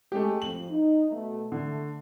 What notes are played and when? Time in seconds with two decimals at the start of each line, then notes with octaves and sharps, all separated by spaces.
0.12 G#3 A3 G4
0.42 F2 F#7
0.70 D#4
1.11 B2 A3
1.52 D3 A3